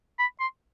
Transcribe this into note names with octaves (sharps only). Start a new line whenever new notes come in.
B5
C6